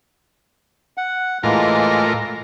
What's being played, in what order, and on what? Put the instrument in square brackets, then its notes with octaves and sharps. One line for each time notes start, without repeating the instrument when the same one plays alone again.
[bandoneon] F#5
[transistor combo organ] A2 F4 A#4 [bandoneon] E3 G#3 A#3